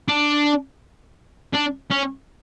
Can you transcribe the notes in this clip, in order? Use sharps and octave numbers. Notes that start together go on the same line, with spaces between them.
D4
D4
C#4